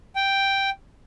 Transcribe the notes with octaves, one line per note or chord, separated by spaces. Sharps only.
G5